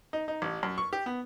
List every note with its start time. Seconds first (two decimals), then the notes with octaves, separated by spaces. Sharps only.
0.13 D#4
0.28 D#4
0.42 A1
0.63 F#2
0.78 C#6
0.93 G4
1.06 B3